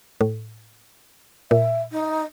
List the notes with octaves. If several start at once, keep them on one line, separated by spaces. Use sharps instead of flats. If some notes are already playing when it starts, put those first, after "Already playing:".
A2
A#2 E5
D#4